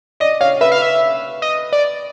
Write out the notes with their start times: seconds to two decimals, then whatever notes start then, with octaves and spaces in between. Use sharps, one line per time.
0.20 D5 D#5
0.41 C#5 F5
0.61 B4 E5
0.72 F5
0.82 E5
1.42 D#5
1.72 D5